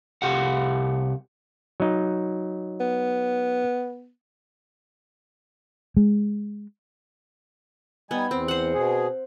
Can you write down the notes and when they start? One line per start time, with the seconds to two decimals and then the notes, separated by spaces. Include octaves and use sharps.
0.22 C2 G4 F5 F#5
1.80 F#3 D#4
2.80 B3
5.97 G#3
8.11 G3 B3 D#4 G#5
8.31 E2 C4
8.48 C5 F#5
8.73 B2 G#4